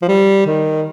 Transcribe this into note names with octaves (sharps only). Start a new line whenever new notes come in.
F3
G3
D#3